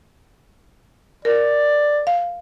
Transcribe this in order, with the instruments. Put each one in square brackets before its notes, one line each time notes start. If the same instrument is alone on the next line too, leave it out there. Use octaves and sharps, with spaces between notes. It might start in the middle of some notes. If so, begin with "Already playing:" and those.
[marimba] A#4 [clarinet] D5
[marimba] F5